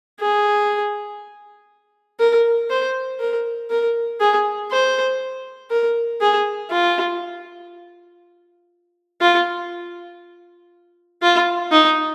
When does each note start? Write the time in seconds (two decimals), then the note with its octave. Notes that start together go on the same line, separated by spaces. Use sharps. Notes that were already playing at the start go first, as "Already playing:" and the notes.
0.20 G#4
2.20 A#4
2.70 C5
3.20 A#4
3.70 A#4
4.20 G#4
4.71 C5
5.70 A#4
6.21 G#4
6.70 F4
9.21 F4
11.22 F4
11.72 D#4